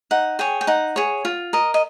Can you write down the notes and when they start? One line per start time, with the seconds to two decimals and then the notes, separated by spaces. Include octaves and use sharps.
0.11 D#4 F#5
0.39 G#4 C#5 G5
0.61 G5
0.67 D#4 F#5
0.96 G#4 C#5
1.25 F4
1.53 A#4 D#5
1.74 D#5